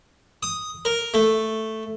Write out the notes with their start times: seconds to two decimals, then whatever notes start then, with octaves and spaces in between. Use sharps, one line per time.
0.43 D#6
0.85 A#4
1.14 A3